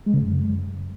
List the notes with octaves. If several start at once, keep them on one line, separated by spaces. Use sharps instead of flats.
G#3
C#3
F#2